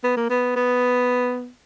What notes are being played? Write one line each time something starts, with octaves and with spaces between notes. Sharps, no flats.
B3
A#3
B3
B3